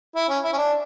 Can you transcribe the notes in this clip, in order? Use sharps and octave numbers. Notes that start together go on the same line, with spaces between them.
E4
C#4
E4
C#4
D4